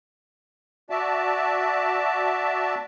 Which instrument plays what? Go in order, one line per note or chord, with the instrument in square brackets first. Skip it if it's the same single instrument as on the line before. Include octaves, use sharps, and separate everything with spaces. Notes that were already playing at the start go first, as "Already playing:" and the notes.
[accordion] F#4 D5 E5 A5